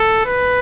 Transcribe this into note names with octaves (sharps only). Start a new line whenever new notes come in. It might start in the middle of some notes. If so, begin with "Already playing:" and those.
Already playing: A4
B4